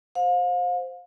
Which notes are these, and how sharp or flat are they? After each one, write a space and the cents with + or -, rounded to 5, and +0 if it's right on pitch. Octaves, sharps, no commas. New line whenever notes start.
C5 +0 F5 +35